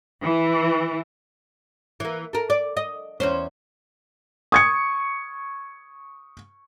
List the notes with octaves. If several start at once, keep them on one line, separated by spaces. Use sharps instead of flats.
E3
E3 A#3
A4 A#4
D5
D#5
E2 C#4 C5
C#6 D#6 G#6 C#7